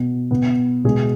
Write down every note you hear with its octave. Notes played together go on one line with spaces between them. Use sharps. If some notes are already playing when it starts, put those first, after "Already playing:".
Already playing: B2 B3
B2 B3
B2 G#3 B3 G#4